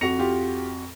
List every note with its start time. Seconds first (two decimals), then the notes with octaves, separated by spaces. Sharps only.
0.01 F2 F#4 A#6 C#7 F7
0.19 F4 G4